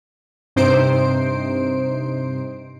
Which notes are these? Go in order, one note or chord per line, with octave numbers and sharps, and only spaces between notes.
G2 C3 D#4 C5 C7 D7